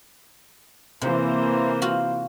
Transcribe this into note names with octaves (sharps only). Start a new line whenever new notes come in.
C3 E3 A#3 C5
F4 F#4